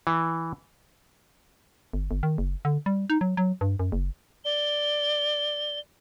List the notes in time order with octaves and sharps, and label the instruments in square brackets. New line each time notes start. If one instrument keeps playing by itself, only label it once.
[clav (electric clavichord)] E3
[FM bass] G1
G1
D#3
F#1
D3
G3
D#4
F#3
F#3
G2
F#2
F#1
[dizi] D5 [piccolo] G7